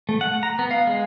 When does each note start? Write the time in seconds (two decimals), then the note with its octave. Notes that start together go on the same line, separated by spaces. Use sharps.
0.09 A3
0.21 F#5
0.43 A#5
0.59 B3
0.71 F5
0.87 G#3